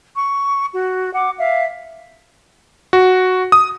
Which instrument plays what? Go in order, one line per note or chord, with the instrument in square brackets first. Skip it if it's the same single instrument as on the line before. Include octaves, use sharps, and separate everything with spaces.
[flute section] C#6
F#4
F#5 D6
E5 F5
[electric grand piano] F#4
D#6